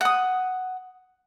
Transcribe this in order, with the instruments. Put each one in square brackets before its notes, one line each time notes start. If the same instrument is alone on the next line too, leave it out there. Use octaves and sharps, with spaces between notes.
[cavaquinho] F#5 D#6